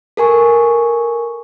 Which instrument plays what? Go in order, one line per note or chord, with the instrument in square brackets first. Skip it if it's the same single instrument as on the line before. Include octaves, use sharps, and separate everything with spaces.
[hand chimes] A4 A#4 G#5 C#6